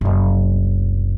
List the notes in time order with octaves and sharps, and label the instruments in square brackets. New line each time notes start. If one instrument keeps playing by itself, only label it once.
[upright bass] F#1 C2